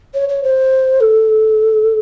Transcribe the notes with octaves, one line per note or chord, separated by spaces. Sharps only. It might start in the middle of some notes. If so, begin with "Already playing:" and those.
C#5
C#5
C5
A4